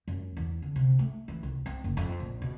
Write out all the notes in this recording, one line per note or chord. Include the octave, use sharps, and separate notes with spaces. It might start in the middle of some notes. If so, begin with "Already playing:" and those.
F#2
E2
D3
C3
A3
E3
C2
C4
F#1
F2
A#1
B2